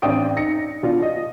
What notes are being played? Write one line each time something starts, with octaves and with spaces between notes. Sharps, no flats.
A1 C4 D4 G5 D#6 D7
D#4 A#6 C#7
B2 D4 F4
D#5